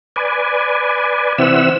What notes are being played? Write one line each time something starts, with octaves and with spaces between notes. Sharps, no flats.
B4 D5 G#5
C3 E3 C4 E5 F#5 E6